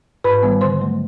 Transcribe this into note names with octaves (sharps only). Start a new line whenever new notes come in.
G#2 B4 B5
D#3 G3 B3
D3 C5 C6
F#3 A3